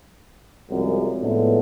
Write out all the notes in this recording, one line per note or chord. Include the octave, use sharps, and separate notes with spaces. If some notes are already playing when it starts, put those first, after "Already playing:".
C2 F#2 C#3 F3 F#3 G#3
A2 D3 F3 G#3 A3 B3